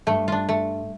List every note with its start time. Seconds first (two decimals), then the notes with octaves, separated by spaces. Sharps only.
0.07 G2 A3
0.28 D4 F4
0.49 A3